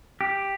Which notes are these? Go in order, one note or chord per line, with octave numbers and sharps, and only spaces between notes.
G4